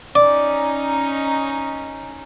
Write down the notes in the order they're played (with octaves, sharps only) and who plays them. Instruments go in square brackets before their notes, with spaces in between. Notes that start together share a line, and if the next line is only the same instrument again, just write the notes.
[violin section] C#4 D#4 [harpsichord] D5